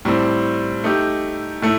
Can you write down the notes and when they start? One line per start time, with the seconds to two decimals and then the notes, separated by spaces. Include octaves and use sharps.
0.05 A2 G3 C4
0.84 A3 D#4 G4
1.62 A2 A3